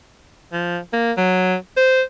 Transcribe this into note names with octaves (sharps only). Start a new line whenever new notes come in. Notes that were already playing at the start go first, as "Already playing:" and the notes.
F3
A#3
F#3
C5